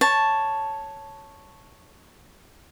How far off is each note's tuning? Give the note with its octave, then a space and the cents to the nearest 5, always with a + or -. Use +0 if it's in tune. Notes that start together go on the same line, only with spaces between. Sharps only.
C#5 +0 A5 +0